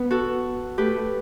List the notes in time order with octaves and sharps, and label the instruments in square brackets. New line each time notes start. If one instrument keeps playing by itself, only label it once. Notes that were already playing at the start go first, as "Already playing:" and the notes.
Already playing: [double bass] B3 [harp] B4
[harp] F#4 A4
[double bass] A3 [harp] G4 B4